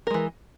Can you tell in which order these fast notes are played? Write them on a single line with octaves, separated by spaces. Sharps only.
A#4 G#3 E3